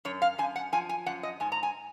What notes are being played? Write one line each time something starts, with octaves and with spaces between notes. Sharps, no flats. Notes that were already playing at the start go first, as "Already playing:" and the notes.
F#2 C#5
F5
F#2 G#5
F#5
F3 G#5
G#5
F#2 F#5
D#5
G#2 G#5
A#5
G#5